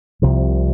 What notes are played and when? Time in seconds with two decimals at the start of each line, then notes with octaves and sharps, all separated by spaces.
0.22 C2 C3 F3